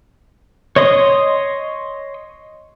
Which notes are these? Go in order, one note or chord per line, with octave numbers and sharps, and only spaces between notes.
C#5 D#5 C6 D#6